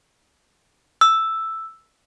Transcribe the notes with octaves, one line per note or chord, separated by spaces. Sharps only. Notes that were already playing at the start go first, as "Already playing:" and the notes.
E6